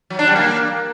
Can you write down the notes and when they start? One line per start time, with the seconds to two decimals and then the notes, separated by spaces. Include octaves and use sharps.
0.10 F#3
0.19 D4
0.27 G3
0.36 A#3